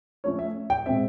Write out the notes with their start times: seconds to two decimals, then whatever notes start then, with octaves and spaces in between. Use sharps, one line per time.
0.24 F3 A3 C#4 C#5
0.39 E5
0.70 G5
0.86 B2 G#3 C4 E5